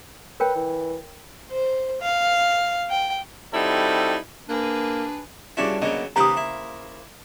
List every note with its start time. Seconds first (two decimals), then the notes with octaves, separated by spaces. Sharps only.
0.40 A#4 B4 C#5 G5
0.56 E3
1.51 C5
2.01 F5
2.90 G5
3.53 G3 C4 D#4 E4 F#4 A4
4.49 A#3 D4 G#4 B4
5.57 G2 C#3 D4 E4 F#4 D5
5.82 C#3 F#3 A#3 B3 D#5
6.16 D#2 C#3 A#3 G4 B4 C5 A#5 D#6
6.37 E4